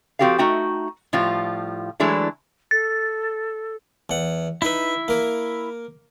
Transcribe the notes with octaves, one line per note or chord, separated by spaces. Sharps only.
F3 C4 F#4 G4 A4 F5
A3 D#4 F#4 E5 G5
A2 F3 G3 F4
E3 F#3 G#3 A3 D4 E4
A4 A6
E2 F#5
D#4 E4 B4 E5
A#3 A#4